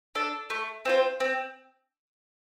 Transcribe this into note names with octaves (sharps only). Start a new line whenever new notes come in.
D4 A4
A3
C4 F4 C5
C4